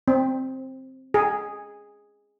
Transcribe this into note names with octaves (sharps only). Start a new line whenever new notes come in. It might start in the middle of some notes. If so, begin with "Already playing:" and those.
C4
G#4